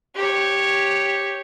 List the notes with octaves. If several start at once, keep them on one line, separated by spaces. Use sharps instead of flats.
G4 C#5